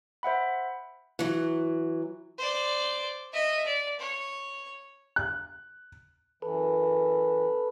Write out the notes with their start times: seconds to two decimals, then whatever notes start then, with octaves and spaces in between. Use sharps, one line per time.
0.23 C5 E5 F#5 B5
1.19 E3 F#3
2.38 C5 D5
3.32 D#5 E5
3.66 D5
4.00 C#5
5.16 F#6
6.42 F#2 E3 A4 B4